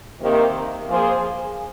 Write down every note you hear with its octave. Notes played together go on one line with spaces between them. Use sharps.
C3 D#3 A#3
F3 A#3 F4 G#4 C5